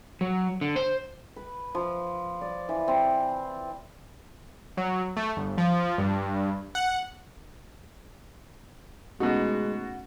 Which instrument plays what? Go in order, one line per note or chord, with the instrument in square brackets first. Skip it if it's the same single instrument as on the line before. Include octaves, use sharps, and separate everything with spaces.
[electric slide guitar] F#3
D3
C5
[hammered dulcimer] B4
F3
D5
E3
C4
[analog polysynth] F#3
A3
G1
F3
G2
F#5
[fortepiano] B2 D#4 [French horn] G#3 [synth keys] A3 C#4 [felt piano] F#4